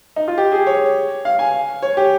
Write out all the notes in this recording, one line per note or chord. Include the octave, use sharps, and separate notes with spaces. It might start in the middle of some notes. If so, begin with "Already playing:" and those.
D#4
F4
G4
G#4
C#5
F5
G#5
C#5
G4